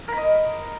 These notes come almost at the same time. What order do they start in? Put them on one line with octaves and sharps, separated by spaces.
A#4 B5 D#5